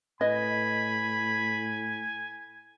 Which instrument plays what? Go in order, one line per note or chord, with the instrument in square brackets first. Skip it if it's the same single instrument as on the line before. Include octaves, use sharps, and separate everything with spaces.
[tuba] A2 [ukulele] B4 D#5 [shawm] G#5 [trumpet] B5